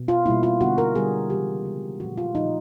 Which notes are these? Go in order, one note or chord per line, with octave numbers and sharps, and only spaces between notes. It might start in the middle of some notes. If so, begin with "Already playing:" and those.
Already playing: B2
F4
B2 G3 A#3 E4
F4
D3 G3 B3 F#4
A#4
D3 G3 B3 G#4
C#3 E3 G#3 G4
C#3 E3 G#3
A#2 F3 A3 F#4
F4
A#2 F3 A3 D#4